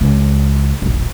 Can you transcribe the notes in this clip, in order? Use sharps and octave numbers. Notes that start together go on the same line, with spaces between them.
C#2
E1 A#1